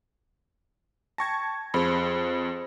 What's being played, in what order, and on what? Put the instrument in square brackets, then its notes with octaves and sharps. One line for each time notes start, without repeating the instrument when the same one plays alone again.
[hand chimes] G5 A#6 [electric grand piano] A5 C#6 G#6
[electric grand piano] F2 C4 [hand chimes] G#4 C5 B5